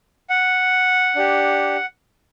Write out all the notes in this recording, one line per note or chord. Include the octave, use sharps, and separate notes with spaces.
F#5
D4 G4